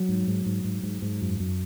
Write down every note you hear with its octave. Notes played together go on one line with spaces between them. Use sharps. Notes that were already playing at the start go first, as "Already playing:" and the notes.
Already playing: F#3
G#2
G#2
G#2
G#2
G#2
G#2
F#2
F#2